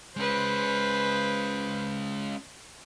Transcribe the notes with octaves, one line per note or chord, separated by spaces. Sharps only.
G#3 C#4 B4 C5